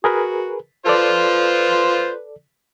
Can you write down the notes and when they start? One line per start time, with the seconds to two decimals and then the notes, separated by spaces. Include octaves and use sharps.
0.04 F#4 G#4 A#4 B4
0.86 F4 A4 B4 C5 D5